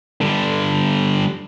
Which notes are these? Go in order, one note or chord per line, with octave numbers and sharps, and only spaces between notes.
D3 G3